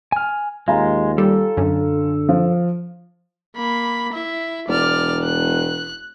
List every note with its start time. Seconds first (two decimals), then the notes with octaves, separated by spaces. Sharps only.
0.12 G#5 F6
0.68 D#2 G#3 F4 G#5 A#5
1.18 G3 A4
1.57 F#2 D3
2.29 F3
3.56 A#3 B5
4.13 E4 E5
4.68 E1 D5 F6
5.24 F#6